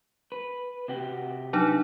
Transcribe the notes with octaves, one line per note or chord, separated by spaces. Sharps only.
B4
C3 F#4 G4
F#3 D4 D#4